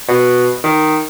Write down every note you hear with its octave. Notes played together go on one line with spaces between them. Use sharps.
B2
D#3